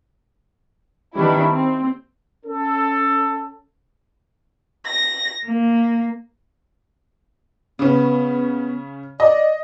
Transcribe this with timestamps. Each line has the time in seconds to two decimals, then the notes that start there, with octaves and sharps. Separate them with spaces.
1.15 D#3 G3 B3 C#4 D4 E4
1.50 C4
2.46 C#4 A4
4.85 A#6
5.46 A#3
7.79 C#3 B3 C#4
9.20 D5 D#5